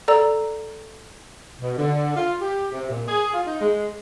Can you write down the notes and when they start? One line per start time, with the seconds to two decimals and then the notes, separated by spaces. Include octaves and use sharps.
0.08 A4 D5 A#5 E6
1.61 B2
1.78 D3
2.16 F4
2.42 G4
2.72 C3
2.90 A#2
3.08 G#4
3.34 F4
3.47 D#4
3.61 G#3